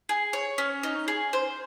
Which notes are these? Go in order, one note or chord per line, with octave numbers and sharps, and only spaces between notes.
G#4
C#5
C#4
D#4
G#4
C5